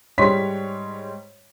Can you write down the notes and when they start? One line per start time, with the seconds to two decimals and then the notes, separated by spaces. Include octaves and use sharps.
0.18 G#2 G3 C#5 C6 B6